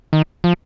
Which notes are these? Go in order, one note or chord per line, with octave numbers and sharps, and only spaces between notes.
D#3
F3